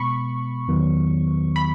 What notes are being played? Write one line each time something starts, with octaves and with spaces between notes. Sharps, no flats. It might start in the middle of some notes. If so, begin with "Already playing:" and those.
Already playing: B2 G#3 B3 B5 C#6
E2 D#3 F#3 B3
B5